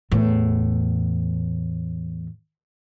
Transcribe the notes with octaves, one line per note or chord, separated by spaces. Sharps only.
E2 A2